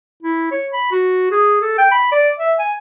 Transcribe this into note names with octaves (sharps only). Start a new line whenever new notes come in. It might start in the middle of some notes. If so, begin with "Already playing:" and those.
E4
C#5
B5
F#4
G#4
A4
G5
B5
D5
E5
G#5